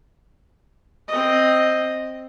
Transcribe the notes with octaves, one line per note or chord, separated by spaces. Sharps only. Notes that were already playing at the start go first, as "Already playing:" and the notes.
C4 D#5